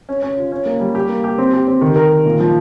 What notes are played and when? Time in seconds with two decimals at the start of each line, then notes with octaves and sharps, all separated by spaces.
0.09 C#4
0.22 C#4
0.37 F4
0.52 C#4
0.66 A#3
0.80 G3
0.95 G4
1.09 A#3
1.24 G4
1.38 C4
1.53 G4
1.68 C4
1.81 D#3
1.96 A#4
2.11 D#3
2.26 A#2
2.40 F3